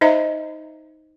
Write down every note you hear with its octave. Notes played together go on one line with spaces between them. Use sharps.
D#4 C5 D#5 E5 A#5